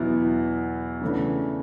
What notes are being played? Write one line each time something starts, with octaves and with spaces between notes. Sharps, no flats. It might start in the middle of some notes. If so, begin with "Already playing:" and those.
Already playing: E2 B2 F#3 B3 E4
C#3 E3 A3 D4